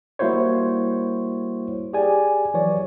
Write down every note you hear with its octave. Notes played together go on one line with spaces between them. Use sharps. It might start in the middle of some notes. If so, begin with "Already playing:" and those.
G3 A#3 E4 F#4 C5 C#5
G4 G#4 D5 G#5
E3 F#3 C#5 D5